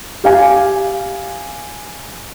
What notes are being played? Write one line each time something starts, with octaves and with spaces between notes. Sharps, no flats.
G4 F5 G#5